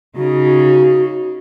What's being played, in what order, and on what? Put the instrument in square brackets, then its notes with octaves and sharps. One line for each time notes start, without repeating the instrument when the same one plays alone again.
[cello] C#3 D#4 [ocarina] F#4